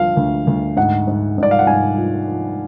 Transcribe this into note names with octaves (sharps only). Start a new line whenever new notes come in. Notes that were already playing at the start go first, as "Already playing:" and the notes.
Already playing: D2 F3 F5
D2
D2
G#2 F#5
G#2
G#2 D5
F5
F#5
G#2 G#5
F3
F3